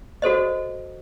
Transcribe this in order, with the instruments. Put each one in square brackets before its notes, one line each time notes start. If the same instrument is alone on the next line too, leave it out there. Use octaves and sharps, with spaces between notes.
[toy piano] F#4 A4 C5 D#5